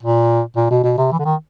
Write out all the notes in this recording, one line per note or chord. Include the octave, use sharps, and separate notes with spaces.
A#2
A#2
B2
B2
C3
E3
D3
D#3